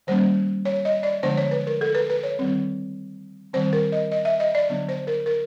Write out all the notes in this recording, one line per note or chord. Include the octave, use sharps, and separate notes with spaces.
D#3 G3 A#3 C#4 C5
C#5
D#5
D5
D3 F3 G#3 B3 D4 C5
C#5
B4
A#4
A4
B4
B4
C#5
D#3 G3 C4
D#3 G3 C4 C5
A#4
D#5
D#5
E5
D#5
D5
D3 F#3 B3 D4
C5
A#4
A#4